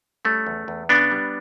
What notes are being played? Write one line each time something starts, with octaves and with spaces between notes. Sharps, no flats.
G3 A3 C#4
E2
E2
C#3 B3 D4
G3